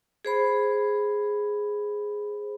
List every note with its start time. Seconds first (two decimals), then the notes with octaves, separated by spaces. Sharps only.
0.25 G#4 C5 B5